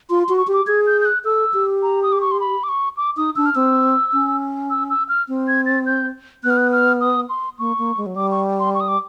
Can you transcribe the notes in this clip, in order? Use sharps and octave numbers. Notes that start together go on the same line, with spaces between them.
F4 C6
C6
F#4
C#6
G4
D6
G#4 G#6
G6
G6
F#6
A4 E6
G4
A#5
D#6
D6
C#6
C6
B5
D6
C#6
D6
D#4 D#6
D4 E6
F6
C4 E6
C#4
E6
E6
F6
C4
G#6
A6
G6
B3 F#6
F6
F#6
F6
D#6
C6
A#3 C#6
A#3
G#3
F#3
G3 D6
C#6
C6
C#6
D#6
D6